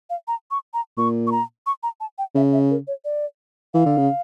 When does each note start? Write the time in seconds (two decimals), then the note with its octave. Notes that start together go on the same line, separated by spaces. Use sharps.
0.10 F5
0.28 A#5
0.51 C#6
0.74 A#5
0.97 A#2 C#6
1.27 C#6
1.32 A#5
1.66 C#6
1.83 A#5
2.00 A5
2.18 G5
2.35 C#3 E5
2.53 E5
2.70 A#4
2.87 C#5
3.05 D5
3.74 E3 F5
3.86 D3
3.97 C#3